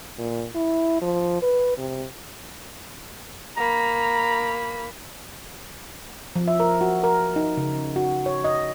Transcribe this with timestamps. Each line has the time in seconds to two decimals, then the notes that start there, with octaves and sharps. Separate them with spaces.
0.18 A#2
0.55 E4
1.02 F3
1.42 B4
1.77 C3
3.57 A#3 A#5 B5
6.36 F3
6.48 E5
6.60 A#4
6.81 F#4
7.04 A#4
7.36 D#4
7.57 C#3
7.96 F#4
8.26 C#5
8.44 D#5